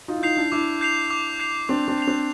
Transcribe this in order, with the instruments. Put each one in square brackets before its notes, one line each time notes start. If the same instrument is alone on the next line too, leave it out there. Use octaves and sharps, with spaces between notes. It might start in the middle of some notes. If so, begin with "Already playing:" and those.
[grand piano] D#4 F4
E4
[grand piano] D#4 F4 [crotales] G6 C7 F7
[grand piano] D4 E4
[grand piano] D4 E4 [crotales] D6
[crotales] G6 C7 F7
D6
G6 C7 F7
[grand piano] C4 D4 [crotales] D6
[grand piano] C4 D4
[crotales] G6 C7 F7
[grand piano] C4 D4